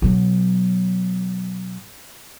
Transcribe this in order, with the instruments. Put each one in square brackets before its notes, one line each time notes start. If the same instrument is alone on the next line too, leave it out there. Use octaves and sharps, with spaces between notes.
[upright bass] B2 F#3